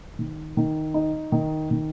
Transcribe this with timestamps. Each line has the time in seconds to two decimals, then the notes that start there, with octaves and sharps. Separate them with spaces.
0.19 D#3
0.57 D#3
0.94 D#4
1.32 D#3
1.71 D#3